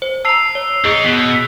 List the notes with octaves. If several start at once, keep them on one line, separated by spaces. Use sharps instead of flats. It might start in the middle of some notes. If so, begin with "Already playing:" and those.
C5
A5 A#5 E6 C7 F7
C#5
D#3 D#4 G#4 D#5
B2